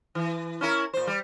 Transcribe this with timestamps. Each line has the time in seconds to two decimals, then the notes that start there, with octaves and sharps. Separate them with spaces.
0.15 E3
0.61 C#4 E4 A#4
0.93 A#2 C5
1.07 G3